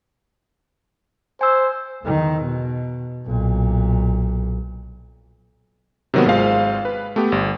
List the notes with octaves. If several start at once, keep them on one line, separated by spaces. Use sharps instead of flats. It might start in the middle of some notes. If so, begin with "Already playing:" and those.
C5 G#5 E6
E2 D#3
B2
B1 A#2
C3 D#3 F#3 A#3 B3
G#1 G#3 F4 C5 F5
B4
A3 B3 G4
G1